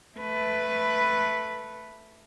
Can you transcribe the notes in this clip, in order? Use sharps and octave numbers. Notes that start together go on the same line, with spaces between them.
A3 B4